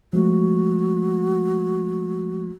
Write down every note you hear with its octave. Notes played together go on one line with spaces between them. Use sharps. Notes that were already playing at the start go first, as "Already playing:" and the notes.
F3 G#3 A3 F#4